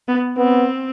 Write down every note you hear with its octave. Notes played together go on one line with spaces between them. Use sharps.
B3
B3 C4